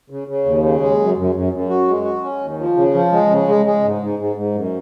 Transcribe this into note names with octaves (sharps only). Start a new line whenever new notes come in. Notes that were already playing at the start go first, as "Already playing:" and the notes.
C#3
C#3
D#2
C#3
G#3
F#2
F#2
F#2
F#2
F#4
G#3
F#4
C#4
D#2
F3
C#3
F3
G#3
C#3
G#3
G#3
G#2
G#2
G#2
G#2
F#2